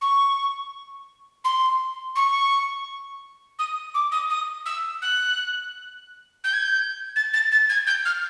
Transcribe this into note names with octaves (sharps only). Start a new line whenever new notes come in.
C#6
C6
C#6
D#6
D6
D#6
D#6
E6
F#6
G6
G#6
G6
A6
A6
A6
G#6
G6
F6